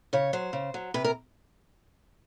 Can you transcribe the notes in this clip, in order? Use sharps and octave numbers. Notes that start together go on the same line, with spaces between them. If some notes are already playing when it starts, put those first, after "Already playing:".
C#3 C#5
F#3 C5
C#3
F#3
C3 B4
A#4